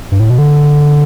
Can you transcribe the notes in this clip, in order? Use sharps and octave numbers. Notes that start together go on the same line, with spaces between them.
G2
A2
B2
D3